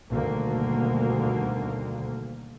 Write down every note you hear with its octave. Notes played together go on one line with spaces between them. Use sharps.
D2 G2 B2 D3 D#3 A#3